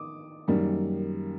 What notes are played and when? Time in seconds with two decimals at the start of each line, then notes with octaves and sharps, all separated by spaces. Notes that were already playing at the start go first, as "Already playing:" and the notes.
Already playing: D#3 D6 D#6
0.48 F#2 D#3 G3 A#3